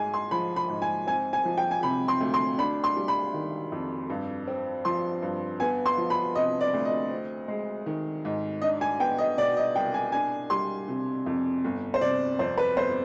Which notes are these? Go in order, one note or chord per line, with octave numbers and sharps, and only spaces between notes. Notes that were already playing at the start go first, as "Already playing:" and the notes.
Already playing: G#2 G#3 G#5
C6
F3 B5
B5
G#2
G#5
C4 G#5
G#5
F3
G5
G#5
C3 B5
C6
D2
C6
D4 B5
C6
G3
B5
D#3
F2
G2
C4
F3 C6
G2
B3 G#5
C6
F3
B5
C3 D#5
D5
D2
D#5
C4
G#3
D#3
G#2
D4 D#5
G#5
B3 G5
D#5
B2 D5
D#5
C2 G5
G#5
D4 G#5
G3 C6
C3
F2
G1
C5
C3 D5
F2 C5
B4
G1 C5